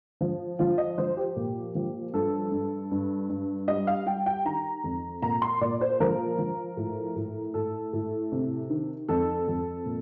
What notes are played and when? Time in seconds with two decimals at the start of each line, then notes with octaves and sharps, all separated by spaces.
0.21 F3
0.59 F3 F4
0.78 D#5
0.98 F3 C5
1.17 G4
1.37 A#2
1.75 F3
2.14 G2 A4
2.52 G2
2.91 G2
3.29 G2
3.68 G3 D#5
3.87 F5
4.06 G3 G5
4.26 G5
4.45 D#3 A#5
4.84 F2
5.22 A#2 A#5
5.42 C6
5.61 A#2 D5
5.81 C5
6.00 F3 A#4
6.39 F3
6.77 A2
7.16 A2
7.54 A2 A4
7.93 A2
8.32 C3
8.70 D#3
9.09 F2 A4
9.47 F2
9.86 A#2